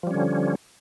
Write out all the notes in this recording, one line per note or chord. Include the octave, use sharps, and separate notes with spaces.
D3 F3 G3 C#4